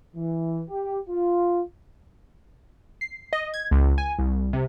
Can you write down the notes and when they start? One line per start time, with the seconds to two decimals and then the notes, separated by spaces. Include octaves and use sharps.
0.16 E3
0.70 G4
1.09 F4
3.01 C7
3.33 D#5
3.54 G#6
3.71 C#2
3.98 G#5
4.19 C2
4.53 C3